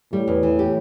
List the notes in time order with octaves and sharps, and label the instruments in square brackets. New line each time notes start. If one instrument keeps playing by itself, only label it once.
[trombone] A2 [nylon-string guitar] G3
[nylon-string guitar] E2
E3
G4